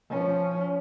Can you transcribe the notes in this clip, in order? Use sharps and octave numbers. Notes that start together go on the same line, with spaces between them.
F3 C#4